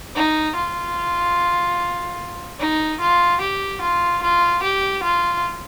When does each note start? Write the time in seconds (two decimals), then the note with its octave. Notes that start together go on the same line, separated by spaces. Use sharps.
0.15 D#4
0.56 F4
2.60 D#4
3.00 F4
3.41 G4
3.82 F4
4.22 F4
4.63 G4
5.04 F4